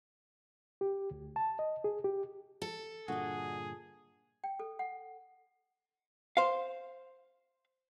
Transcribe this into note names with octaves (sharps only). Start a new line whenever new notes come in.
G4
D2
A5
D#5
G#4
G4
A4
G2 A#2 D3 F#4 G#4 D#5
G5
A4
F#5
C5 F5